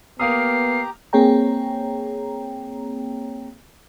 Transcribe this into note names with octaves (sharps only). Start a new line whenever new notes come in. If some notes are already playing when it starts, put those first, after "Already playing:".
A#3 B3 G4 F5 A#5 D#6 C7
A#3 C4 G#4 C#5 G5 A#5